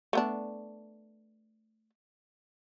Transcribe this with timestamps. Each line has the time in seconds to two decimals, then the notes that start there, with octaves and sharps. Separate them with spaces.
0.13 A3 B3 D4